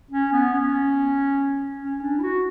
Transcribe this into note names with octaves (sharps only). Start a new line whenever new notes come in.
C#4
B3
C#4
C#4
D4
E4
F#4